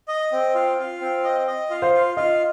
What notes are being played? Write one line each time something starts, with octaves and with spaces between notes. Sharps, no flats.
D#5
C4
F4
F4
C4
D#5
D#5
F4
C5 F5
F4
F4 D#5